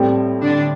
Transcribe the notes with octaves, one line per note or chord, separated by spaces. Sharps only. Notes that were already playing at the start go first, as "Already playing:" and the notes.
Already playing: A2 G3 C4
D3 D4